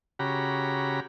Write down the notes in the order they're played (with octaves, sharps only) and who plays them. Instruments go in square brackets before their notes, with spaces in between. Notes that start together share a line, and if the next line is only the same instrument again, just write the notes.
[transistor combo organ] C#3 F#4 G4 A#5 B5